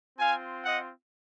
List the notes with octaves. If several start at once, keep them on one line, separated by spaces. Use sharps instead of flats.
C4 F4 F5 G#5
D#5 F#5